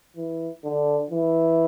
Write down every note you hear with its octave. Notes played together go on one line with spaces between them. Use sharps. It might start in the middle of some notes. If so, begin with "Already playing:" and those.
E3
D3
E3